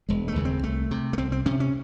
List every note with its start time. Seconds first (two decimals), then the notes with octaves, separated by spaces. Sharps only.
0.09 E1 G#3
0.28 A3
0.36 D#2 C#3
0.45 C4
0.63 C2 A3
0.91 C3
1.13 A3
1.18 C2 C4
1.32 C4
1.46 C3 C#4
1.60 C#4